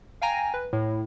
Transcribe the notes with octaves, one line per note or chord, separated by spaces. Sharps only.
F5 G5 G#5 A#5 A#6
B4
A2